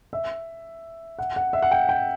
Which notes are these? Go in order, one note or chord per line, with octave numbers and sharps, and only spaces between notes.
E5
F#5
F#5
E5
F#5
G5
G5